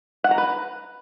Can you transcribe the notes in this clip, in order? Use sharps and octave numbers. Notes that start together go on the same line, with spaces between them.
F#5
A#5
B4